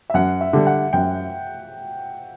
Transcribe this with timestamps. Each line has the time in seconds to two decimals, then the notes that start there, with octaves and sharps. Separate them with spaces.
0.10 E5
0.14 F#2 F#5
0.41 E5
0.53 D3 G3
0.67 F#5
0.93 F#2 G5